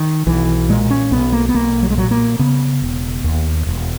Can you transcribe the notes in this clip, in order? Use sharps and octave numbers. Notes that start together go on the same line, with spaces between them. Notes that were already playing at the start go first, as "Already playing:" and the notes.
Already playing: D#3
B1 E3
A#2 G#3
C#4
B1 B3
A#3
B3
B1 A#3
F#3
G#3
A#2 F#3
A#3
C#3 B3
E1
D#2
E1